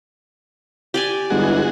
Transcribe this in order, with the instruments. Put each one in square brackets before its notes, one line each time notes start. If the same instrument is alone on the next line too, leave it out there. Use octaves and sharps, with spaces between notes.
[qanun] G4 D5 G#5
[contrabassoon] G1 [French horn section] E3 G#3 [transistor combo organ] F#4 G#4